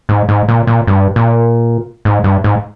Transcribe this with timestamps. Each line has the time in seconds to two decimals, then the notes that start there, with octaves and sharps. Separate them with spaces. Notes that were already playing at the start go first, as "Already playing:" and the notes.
0.09 G#2
0.29 G#2
0.48 A#2
0.67 A#2
0.87 G2
1.16 A#2
2.05 G#2
2.24 G2
2.44 G#2